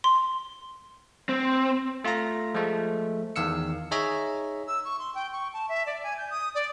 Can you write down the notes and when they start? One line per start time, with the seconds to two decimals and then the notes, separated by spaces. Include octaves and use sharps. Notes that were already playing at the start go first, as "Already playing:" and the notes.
0.04 C6
1.29 C4
2.04 A3 F4 F5 A#5 A#6
2.54 F3 G#3 A3
3.36 E2 D#3 F5 E6 C#7
3.91 D#4 G#4 C#5 E5 A#5
4.68 E6
4.85 C#6
4.99 C6
5.15 G5
5.32 C#6
5.54 A5
5.69 E5
5.86 D5
6.03 G#5
6.18 G6
6.31 D#6
6.55 D5